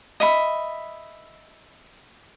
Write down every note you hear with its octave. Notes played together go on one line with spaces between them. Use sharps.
D#5 E5 B5